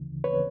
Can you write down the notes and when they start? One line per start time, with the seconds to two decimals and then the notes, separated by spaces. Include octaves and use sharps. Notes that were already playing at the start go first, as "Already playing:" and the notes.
Already playing: D2 C#3 E3
0.24 B4 C#5